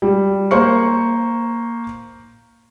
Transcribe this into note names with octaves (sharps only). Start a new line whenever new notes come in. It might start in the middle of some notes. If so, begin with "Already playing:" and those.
G3
A#3 C5 C#6 C#7